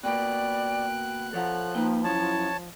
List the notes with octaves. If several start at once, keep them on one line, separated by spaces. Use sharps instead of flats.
B2 A#3 B3 D5 G5 F#6
F3 A4 C#5 F#5
A#3 D#4 B4 G5
F#2 E4 C#5 A5